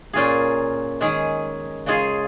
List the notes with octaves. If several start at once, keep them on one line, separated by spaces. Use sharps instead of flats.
A#2 A#3 C#4 F4 G#4
D#3 G#3 C#4 G#4
C#3 G#3 F4 G#4